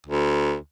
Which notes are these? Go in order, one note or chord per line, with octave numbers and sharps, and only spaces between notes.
D2